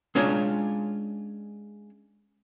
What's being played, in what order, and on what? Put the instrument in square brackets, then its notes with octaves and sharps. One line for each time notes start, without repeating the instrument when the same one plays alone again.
[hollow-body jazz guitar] G#3 C#4 D4 F4 C#5 A#5